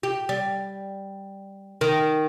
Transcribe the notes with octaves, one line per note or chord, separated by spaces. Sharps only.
G4
G3
D#3